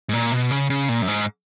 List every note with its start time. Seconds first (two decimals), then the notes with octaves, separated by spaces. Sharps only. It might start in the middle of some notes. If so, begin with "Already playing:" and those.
0.09 G#2
0.13 A#2
0.32 B2
0.51 C#3
0.70 C#3
0.89 A#2
1.02 F#2
1.08 G#2